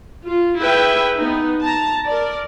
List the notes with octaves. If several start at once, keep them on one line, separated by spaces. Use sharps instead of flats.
F4
E4 G#4 B4 E5 G5
B3 D#4
A5 A#5
A#4 D5